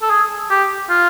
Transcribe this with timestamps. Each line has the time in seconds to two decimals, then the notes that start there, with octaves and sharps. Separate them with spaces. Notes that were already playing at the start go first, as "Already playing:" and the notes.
0.02 A4
0.10 G#4
0.50 G4
0.90 F4